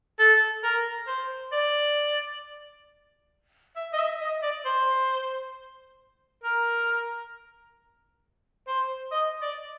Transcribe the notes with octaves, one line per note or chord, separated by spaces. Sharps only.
A4
A#4
C5
D5
E5
D#5
E5
D#5
D5
C5
A#4
C5
D#5
D5